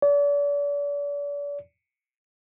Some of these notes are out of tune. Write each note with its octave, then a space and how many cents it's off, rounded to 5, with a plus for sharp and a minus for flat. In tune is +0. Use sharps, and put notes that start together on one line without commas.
D5 -40